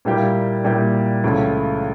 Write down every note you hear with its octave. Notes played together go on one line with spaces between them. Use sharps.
A#2 G3 A#3 E4 G4
A#2 G3 A#3 E4 G4
C#2 C#3 F3 A3 E4